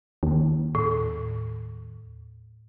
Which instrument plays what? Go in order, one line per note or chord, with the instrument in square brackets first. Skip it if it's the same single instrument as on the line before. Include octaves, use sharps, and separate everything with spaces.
[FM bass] D#2
[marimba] A2